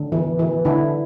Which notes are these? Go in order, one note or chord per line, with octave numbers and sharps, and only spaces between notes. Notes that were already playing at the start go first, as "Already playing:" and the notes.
Already playing: D3
E3
E3
D3 E4